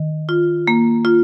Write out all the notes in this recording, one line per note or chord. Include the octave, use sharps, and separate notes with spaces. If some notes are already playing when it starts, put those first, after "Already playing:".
Already playing: D#3
F4
A#3
F4